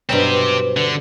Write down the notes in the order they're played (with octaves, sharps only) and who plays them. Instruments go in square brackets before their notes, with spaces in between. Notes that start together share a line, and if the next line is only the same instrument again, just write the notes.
[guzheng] G2 B2 F#3 [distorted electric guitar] C4 G4 [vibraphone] B4 C5
[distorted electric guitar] D3